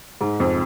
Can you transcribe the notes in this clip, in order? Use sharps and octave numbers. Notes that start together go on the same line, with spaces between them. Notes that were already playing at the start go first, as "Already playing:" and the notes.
G#2
F2